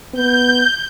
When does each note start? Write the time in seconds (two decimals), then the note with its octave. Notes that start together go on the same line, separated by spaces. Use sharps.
0.14 B3 G6